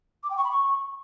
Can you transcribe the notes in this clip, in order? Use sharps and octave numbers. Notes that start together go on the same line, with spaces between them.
D6
G5
C#6
B5
C#6